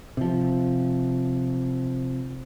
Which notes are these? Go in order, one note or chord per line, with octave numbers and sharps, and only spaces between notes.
C3 F3